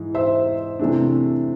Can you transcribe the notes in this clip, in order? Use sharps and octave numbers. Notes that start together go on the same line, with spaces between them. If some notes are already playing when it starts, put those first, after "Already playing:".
Already playing: G#2 E3 G#3
C5 E5
C3 E3 A3 D4